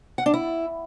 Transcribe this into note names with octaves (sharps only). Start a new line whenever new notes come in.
F#5
D4
E4